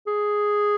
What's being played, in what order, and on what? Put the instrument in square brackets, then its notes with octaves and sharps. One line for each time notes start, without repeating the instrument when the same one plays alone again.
[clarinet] G#4